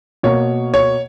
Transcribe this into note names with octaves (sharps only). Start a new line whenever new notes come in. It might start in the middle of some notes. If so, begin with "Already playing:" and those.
B2 A#3 C#5
C#5